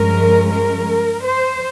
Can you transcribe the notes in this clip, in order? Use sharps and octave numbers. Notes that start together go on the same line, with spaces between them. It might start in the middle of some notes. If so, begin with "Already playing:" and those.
Already playing: G2 F3 G#3 C#4 A#4
A#4
C5